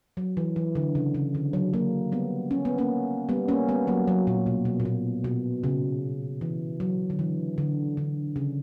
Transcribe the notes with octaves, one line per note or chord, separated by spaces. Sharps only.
F#3
E3
E3
D3
C#3
C#3
D3
F#3
F#3 A#3
G3 B3
C#4
B3
A#3 C#4
G3 B3
A#3 C#4
G3 B3
F#3 A#3
F#3
A#2
B2
B2
A#2
B2
B2
C#3
E3
F#3
D3
E3
D3
D3
C#3